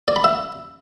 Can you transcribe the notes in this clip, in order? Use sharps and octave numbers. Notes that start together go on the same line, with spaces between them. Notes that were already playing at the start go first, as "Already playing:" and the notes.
D5
B5
E5